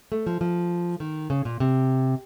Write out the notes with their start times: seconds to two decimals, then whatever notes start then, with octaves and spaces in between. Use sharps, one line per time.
0.12 A3
0.26 F3
0.41 F3
1.00 D#3
1.30 C#3
1.45 A#2
1.60 C3